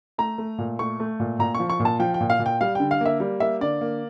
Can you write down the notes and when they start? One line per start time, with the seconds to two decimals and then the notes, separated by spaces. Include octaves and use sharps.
0.18 A3 A#5
0.38 A3
0.58 A#2
0.79 A3 C#6
1.00 A3
1.20 A#2
1.39 A#2 A#5
1.55 C#6
1.60 F3
1.70 C#6
1.80 A#2
1.85 A5
1.99 F3 G5
2.14 G5
2.21 A#2
2.30 F5
2.40 A#2
2.46 G5
2.61 G3 F5
2.75 D3 G5
2.91 F5
3.01 A#3 E5
3.20 G3
3.40 A#3 E5
3.61 D3 D5
3.81 A#3